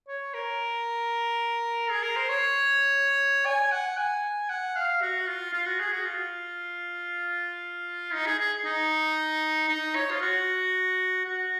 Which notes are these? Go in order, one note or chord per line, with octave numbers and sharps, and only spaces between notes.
C#5
A#4
G#4
A#4
C5
C#5
G#5
F#5
G#5
F#5
F5
F#4
F4
F4
F#4
G#4
F#4
F4
D#4
G#4
G#4
D#4
D#4
C#5
F4
F#4
F#4